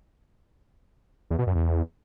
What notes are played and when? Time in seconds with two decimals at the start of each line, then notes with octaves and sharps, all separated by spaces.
1.30 E2
1.39 B2
1.47 F#2
1.55 E2